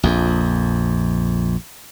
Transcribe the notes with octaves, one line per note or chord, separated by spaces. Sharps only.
A#1 F2